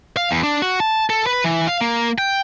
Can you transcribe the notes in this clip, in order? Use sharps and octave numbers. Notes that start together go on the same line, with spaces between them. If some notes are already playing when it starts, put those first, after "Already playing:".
F5
E2
D4
F#4
A5
A4
B4
E3
F5
A#3
G5